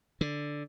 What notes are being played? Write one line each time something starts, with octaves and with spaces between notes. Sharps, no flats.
D3